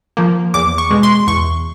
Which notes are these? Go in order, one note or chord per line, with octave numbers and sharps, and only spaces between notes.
F3 A#3
E2 D6
C#6
B2 G#3
C6
E2 C#6